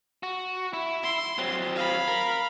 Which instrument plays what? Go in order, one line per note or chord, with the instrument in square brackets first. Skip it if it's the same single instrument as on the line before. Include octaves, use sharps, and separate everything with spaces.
[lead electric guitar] F#4
E4
[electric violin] C6
[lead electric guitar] F#3 C4
[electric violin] F5 B5
[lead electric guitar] A#4